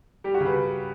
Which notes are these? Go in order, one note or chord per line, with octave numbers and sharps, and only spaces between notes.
G3 G4
F#4
C#3
B4